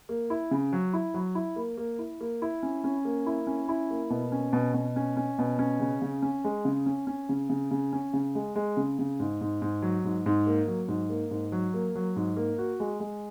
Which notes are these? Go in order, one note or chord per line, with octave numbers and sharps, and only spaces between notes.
A#3
E4
C#3
F#3
E4
F#3
E4
A#3
A#3
E4
A#3
E4
C#4
C#4
A#3
E4
C#4
E4
A#3
B2
C#4
B2
B2
C#4
C#4
B2
C#4
C#3
C#3
C#4
G#3
C#3
C#4
C#4
C#3
C#3
C#3
C#4
C#3
G#3
G#3
C#3
C#3
G#2
G#2
G#2
F#3
G#2
G#2
A#3
F#3
G#2
A#3
G#2
F#3
A#3
F#3
G#2
A#3
F#4
G#3
G#3